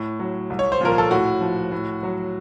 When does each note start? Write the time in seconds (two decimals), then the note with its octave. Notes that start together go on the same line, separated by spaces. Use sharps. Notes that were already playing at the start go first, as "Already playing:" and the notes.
Already playing: A2
0.20 F#3
0.50 C2
0.59 C#5
0.72 C5
0.81 A#2 F3 A#4
0.98 A4
1.11 A2 F#4
1.41 F3
1.72 A2
2.03 F#3